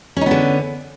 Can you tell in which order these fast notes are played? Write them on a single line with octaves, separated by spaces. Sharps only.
C#4 D#4 B3 D3